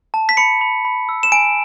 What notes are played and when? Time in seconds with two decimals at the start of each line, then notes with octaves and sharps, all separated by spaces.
0.14 A5
0.29 B6
0.37 B5 C#7
0.61 B5
0.85 B5
1.09 E6
1.23 E7
1.32 G#5 D7